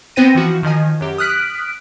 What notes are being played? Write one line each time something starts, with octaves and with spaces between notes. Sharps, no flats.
B3 C4 C5 G5 A#6 D#7
E3 F3 F#4
D#3 F3 D#5 G#5
F#2 G4
D#6 F6 F#6 B6 D7